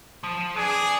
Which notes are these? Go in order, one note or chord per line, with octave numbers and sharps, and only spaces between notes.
F3
G#4 B4 D5